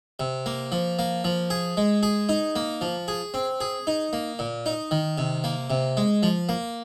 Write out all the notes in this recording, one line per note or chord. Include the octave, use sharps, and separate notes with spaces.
C3
A#3
F3
A#3
F3
G#4
G#3
G#4
D#4
A#3
F3
G#4
C4
G#4
D#4
A#3
A#2
D#4
D#3
C3
A#3
C3
G#3
F3
A#3